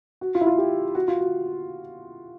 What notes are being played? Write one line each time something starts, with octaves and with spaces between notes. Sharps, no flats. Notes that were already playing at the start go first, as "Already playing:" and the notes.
F#4
F4
E4
F4
G4
F#4
F4
F#4